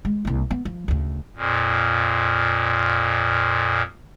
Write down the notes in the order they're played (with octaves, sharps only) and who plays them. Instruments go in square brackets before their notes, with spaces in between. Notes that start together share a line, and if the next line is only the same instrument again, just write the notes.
[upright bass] G#3
C2 A#3
B3
F3
D2 C#3
[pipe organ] F2 A#2